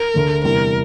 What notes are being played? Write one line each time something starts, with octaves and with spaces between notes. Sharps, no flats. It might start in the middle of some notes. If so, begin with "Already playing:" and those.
Already playing: A#4
D2 D3 A3
E2 C3 G3 A#4